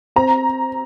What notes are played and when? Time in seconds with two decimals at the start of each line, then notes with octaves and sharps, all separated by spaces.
0.16 C4 A#5